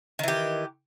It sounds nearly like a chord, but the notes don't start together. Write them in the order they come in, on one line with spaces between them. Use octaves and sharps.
D#3 E3 G4